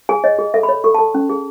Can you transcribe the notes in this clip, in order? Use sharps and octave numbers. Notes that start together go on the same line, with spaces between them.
G#4 G#5
C#5 D#5
G#4
A4 E5
B5
C#5
A4 C#6
A5
A4
C#4
G#4